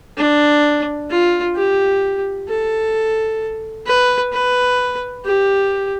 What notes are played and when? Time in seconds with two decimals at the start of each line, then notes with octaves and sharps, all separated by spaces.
0.17 D4
1.10 F4
1.56 G4
2.48 A4
3.87 B4
4.33 B4
5.25 G4